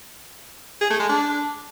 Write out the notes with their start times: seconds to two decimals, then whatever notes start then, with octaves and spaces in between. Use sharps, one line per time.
0.81 G#4
0.90 A3
1.00 G#3
1.09 D4